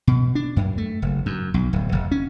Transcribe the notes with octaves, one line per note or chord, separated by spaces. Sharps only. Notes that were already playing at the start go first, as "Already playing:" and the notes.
B2
D4
F#2
A3
F#1
F#2
B1
D1
F1
C#4